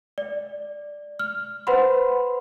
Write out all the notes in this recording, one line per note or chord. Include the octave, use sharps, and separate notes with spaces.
D5
F6
B4 C5 F#5 B5 C6